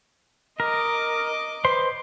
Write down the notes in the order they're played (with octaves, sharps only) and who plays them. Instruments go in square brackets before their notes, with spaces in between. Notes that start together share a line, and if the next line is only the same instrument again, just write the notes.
[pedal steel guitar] A#4 [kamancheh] D#5 D6
[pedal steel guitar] B4 C5 C6